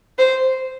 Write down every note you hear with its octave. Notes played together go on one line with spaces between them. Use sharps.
C5